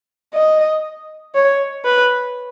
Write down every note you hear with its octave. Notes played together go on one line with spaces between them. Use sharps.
D#5
C#5
B4